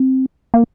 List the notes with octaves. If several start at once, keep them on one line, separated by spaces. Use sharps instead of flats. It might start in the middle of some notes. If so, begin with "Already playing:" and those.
Already playing: C4
A#3